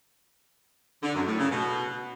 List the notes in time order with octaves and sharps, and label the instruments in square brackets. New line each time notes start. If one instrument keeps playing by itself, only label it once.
[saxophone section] D3
F#2
A2
C#3
B2